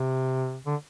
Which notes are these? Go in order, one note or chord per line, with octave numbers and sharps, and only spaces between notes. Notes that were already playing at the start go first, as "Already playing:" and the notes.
Already playing: C3
D3